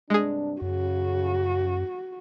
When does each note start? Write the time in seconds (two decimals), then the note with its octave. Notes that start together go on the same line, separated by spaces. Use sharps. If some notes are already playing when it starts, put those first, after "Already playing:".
0.10 G2 C3 G#3 D4 G#4
0.62 F#2 C#3 F#4